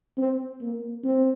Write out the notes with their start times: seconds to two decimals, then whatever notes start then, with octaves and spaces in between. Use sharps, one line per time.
0.17 C4
0.61 A#3
1.04 C4